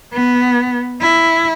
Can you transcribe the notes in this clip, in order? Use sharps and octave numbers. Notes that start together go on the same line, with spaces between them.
B3
E4